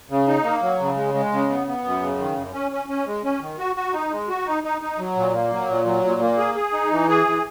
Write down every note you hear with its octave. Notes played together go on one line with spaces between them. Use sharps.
C#3
D#4
A#3
F#3
C#3
G#3
G#3
C#3
B3
B3
F#2
C#3
D#3
F#2
C#4
C#4
C#4
G#3
C#4
D#3
F#4
F#4
D#4
G#3
F#4
D#4
D#4
D#4
F#3
A#2
A#3
F#3
A#2
F#3
A#2
A#3
G#4
G#4
D#4
E3
G#4
E3